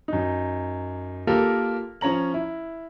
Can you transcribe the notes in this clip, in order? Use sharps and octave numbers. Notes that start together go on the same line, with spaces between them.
F#2 D#4
A#3 F4 G4 A4 A#4
F3 C#4 C#5 A#5 F#7
E4